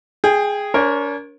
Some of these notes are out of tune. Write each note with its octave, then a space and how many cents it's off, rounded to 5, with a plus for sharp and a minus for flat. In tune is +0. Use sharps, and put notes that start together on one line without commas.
G#4 +0 G5 +20
D4 -45 A#4 +15 C#5 -30